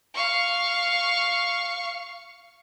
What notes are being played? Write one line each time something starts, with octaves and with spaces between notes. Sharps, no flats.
F5 C#6